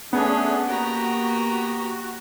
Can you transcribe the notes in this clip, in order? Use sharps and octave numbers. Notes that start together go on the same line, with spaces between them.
A3 B3 C#4 D4 G#4
A#3 F#4 G4 A#5